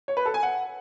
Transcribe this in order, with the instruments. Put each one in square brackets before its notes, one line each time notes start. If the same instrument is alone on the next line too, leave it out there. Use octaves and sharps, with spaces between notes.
[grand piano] C#5
B4
A4
G#5
F#5